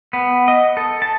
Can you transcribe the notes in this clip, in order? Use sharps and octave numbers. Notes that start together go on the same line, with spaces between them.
B3
D#5
A4
A5